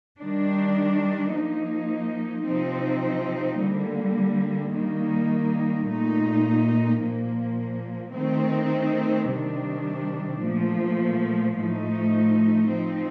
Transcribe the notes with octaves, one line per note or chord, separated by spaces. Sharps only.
D#3 G3 D4
F3 A#3 D#4
C3 F3 C4 D#4
D3 G3 A#3
D#3 G3 A#3 D#4
A#2 A3 D#4
A#2 F3 A#3
D#3 A3 C4 D#4
C3 D#3 G3 D4
A#2 F3 A3
A2 F3 A3 D#4
F3 C4 D#4